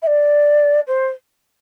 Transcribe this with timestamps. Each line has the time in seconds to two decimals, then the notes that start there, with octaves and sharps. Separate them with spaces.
0.02 E5
0.07 D5
0.87 C5